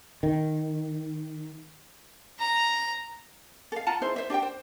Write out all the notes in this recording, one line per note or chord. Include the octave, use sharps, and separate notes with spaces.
D#3
A#5
A4 F5
F4 F#5 A5 A#5
D#4 E4 G#4 C5
C5 E5
D4 G4 E5 G5
C5